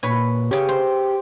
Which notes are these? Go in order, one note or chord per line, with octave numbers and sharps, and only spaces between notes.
A#2 B4 C#5 G#5
C#3 C#4 G4
C5